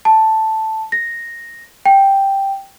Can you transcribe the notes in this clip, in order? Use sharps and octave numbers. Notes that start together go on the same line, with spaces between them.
A5
A#6
G5